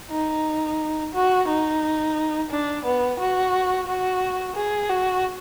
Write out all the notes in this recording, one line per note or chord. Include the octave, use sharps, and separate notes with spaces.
D#4
F#4
D#4
D4
B3
F#4
F#4
G#4
F#4